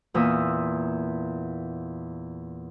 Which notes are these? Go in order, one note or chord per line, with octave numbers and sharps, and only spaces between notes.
E2 A#2 A#4 E5 D#6